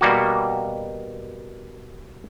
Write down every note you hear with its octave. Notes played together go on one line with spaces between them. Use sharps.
B2 G3 A#3 F#4